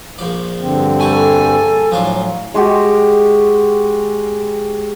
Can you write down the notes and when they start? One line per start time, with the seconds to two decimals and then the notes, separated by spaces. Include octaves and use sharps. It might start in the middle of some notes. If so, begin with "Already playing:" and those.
0.18 A#1 F3 D5
0.60 G2 D3 C4
1.01 A#1 G3 F#4 A4 G#5
1.91 A2 F3 F#3 D4 F4
2.54 G#3 F#4 G4